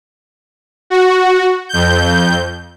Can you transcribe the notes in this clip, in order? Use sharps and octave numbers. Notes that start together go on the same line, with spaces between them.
F#4
F2 G6